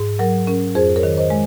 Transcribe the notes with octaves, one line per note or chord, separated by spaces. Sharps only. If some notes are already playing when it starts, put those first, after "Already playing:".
Already playing: G#2
F#3 A#4
C#4 A#4
F2 G#4 C5
A#4 C#5
D#3
C5 D#5
G#3